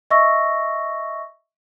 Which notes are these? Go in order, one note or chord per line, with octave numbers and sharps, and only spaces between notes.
D#5 E5 C#6 E6 A#6